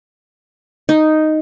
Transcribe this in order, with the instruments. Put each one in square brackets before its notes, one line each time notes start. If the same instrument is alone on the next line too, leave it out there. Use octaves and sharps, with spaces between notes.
[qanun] D#4